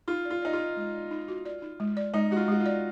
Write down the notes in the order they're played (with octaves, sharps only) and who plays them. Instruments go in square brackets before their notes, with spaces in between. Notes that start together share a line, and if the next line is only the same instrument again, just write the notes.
[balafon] D#4 [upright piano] F4
[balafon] D5
[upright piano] F4
[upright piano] D#4 [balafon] D5
[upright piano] F4
[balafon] D#4
G#3
D5
D#4
F#4
D5
D#4
G#3
D5
[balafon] G#3 [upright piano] D#4
[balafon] G#3 [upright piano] F#4
[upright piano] F4
[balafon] G#3 [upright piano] F#4
[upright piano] F4
[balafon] D5